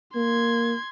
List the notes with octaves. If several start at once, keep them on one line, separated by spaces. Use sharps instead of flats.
A#3 C6 G#6